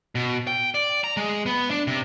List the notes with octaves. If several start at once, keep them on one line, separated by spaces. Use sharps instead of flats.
B2
G5
D5
A#5
G#3
B3
D4
C3